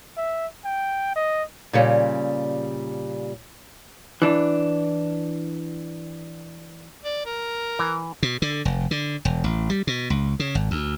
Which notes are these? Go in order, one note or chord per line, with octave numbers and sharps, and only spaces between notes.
E5
G5
D#5
A#2 C#3 G3
E3 D4
D5
A#4
E3
B2
D3
F1
D3
E1
A1
G3
B2
C#2
C#3
G#1
D2